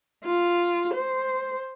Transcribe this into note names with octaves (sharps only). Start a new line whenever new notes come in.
F4
C5